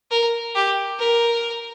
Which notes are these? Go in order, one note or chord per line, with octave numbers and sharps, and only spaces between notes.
A#4
G4
A#4